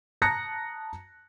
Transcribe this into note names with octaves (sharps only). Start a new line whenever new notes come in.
A5 A#5 D#6 F#6 A#6 C#7